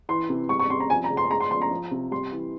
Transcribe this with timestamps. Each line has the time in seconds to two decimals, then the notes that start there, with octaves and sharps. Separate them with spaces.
0.09 E3 C6
0.29 C3
0.49 G3 C#6
0.59 C#6
0.69 C3 C6
0.80 A#5
0.90 F3 G#5
1.04 A#5
1.10 C#3
1.17 C6
1.30 G#3 A#5
1.40 C6
1.51 F3 C6
1.62 A#5
1.71 F3
1.91 C3
2.11 G3 C6
2.32 E3